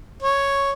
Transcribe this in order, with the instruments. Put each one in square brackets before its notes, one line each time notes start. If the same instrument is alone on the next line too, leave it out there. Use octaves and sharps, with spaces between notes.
[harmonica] C#5